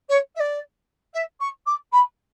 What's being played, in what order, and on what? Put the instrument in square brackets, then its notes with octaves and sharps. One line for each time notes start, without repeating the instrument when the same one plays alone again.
[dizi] C#5
E5
D5
E5
C#6
D6
B5